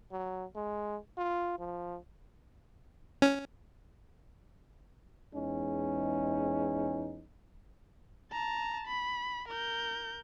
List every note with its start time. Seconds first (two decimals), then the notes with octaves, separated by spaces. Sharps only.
0.12 F#3
0.56 G#3
1.18 F4
1.59 F3
3.22 C#4
5.33 E2 G#3 C#4 D#4
8.32 A5 A#5
8.87 B5
9.48 A#4 G6